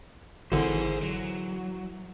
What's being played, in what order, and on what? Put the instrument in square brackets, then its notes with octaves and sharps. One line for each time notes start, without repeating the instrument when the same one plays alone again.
[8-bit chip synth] G#1 D3 [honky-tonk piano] E3 [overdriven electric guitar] G#4 C5
[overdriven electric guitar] F#3